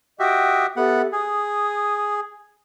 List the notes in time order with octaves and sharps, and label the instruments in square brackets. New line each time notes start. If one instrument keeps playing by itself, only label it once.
[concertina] F#4 G4 E5 [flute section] D#5 G5 D#6
[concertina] B3 F#5 [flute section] G4 A4 E5
[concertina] G#4 [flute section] D#6